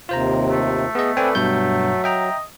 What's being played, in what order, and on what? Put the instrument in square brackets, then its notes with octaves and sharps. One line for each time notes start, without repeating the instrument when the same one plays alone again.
[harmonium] D#2 C3 [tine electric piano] F4 C5 A#5
[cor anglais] A3
[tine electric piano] B3 D#5 [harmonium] G#4
[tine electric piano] C4 G5 G#5 [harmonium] A4 B4 D5
[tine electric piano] G2 B2 G6 [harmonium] F#3
[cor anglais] D#5 [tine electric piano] E5 G5 A#5